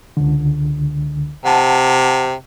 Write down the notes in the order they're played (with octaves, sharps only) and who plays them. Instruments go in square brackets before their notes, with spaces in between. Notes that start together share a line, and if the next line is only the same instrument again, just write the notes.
[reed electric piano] C#2 D3
[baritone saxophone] C3 [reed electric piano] F#5 A5